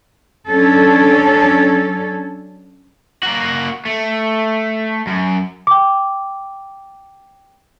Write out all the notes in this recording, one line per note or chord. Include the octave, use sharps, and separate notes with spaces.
F#3 C#4 D4 A4
A#3 F#4
A3
F#2
G5 D6